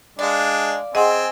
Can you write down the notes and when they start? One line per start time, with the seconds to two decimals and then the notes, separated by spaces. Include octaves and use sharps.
0.19 G#3 D4 D5 F5
0.95 C4 G#4 D#5 F#5 G#5 C6